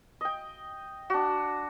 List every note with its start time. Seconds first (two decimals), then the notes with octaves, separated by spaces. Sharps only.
0.21 D#5 G5
1.10 D4 F#4